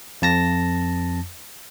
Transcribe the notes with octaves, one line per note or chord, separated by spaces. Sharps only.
F2 A5 A#6